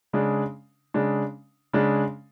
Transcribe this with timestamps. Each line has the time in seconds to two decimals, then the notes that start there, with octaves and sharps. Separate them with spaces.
0.13 C#3 G#3 D4
0.94 C#3 G#3 D4
1.73 C#3 G#3 D4